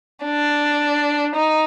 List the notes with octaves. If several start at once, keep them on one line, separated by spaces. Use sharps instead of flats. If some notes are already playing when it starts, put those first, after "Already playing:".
D4
D#4